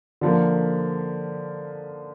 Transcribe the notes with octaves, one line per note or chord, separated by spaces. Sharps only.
D3 F3 A#3